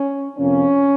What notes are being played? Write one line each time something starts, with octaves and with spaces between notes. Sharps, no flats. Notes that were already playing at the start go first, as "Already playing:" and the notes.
Already playing: C#4
F2 C3 F3 A#3 C#4